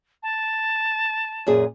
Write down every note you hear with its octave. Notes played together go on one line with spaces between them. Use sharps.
A5
F#2 A#2 G#4